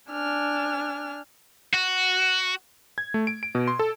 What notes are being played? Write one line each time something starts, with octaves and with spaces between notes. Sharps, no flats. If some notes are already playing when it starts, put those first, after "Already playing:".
D4 G#5 F6
F#4
G#6
A3
D7
D7
B2
C6
A4